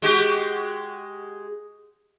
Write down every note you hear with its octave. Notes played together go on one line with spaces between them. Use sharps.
G#3 F#4 G4